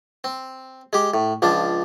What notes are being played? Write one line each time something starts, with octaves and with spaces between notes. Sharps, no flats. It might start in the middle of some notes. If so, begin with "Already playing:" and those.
C4
G#3 G4
A2
C#2 F3 D4